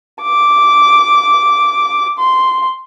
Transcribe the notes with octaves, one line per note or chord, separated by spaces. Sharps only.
D6
C6